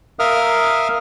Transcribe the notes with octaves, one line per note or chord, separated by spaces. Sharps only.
A#4 E5 F5 D#6 F6